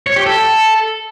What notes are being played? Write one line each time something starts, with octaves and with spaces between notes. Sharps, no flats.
C#5
G4
A4